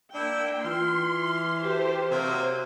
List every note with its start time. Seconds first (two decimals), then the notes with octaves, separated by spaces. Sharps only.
0.14 A#3 D4 E4 G5
0.64 E3 F4 C6 F6
1.65 F#4 G4 A4 C5
2.11 C3 F#3 A#3 F4 C5